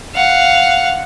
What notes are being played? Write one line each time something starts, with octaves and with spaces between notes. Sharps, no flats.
F5 F#5